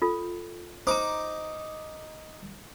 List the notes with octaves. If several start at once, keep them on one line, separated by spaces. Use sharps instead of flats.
F4 A4
D#4 C5 A#5 D6